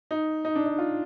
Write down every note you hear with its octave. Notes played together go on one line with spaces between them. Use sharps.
D#4
D#4
D4
D#4
F4